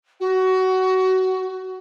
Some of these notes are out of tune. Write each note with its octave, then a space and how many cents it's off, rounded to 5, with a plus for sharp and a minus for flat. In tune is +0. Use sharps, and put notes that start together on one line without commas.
F#4 +20